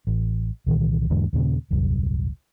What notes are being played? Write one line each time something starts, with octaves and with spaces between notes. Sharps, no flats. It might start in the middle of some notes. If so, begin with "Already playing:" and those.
A1
C2 A#2 D#3 E3
E2 G#2 D3
D#2 A#2 C#3
D#1 C2 F#2